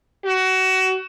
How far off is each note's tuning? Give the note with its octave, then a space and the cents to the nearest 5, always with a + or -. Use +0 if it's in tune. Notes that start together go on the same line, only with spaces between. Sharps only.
F#4 +25